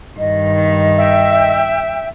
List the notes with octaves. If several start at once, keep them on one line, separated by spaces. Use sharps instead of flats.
G2 D#3 D#5
E5 G5